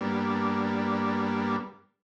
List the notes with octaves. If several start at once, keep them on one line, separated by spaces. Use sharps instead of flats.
G2 G3 A#3 B3 D4